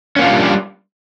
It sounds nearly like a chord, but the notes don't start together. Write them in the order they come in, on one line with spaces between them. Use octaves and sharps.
C#4 A#3 F4 D4 G3